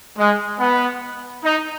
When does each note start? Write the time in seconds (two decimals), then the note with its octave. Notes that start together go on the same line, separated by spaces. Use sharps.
0.18 G#3
0.60 B3
1.45 D#4